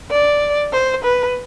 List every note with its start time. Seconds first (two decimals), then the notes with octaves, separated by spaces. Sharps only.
0.10 D5
0.73 C5
1.04 B4